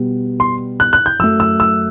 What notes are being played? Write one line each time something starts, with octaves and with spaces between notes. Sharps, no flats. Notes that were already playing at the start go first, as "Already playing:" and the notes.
Already playing: B2 G3 B3
C6
F#6
F#6
G6
F#2 F#3 A3 E6
E6
E6